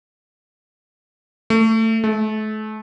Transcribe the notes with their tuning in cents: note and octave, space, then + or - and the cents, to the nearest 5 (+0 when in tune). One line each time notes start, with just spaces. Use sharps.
A3 +20
A3 -35